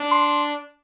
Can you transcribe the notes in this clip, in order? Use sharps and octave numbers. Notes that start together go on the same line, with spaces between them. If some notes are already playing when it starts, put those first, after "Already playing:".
Already playing: D4
C6